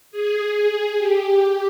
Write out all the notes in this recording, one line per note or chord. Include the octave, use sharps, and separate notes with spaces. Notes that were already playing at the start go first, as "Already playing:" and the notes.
G#4
G4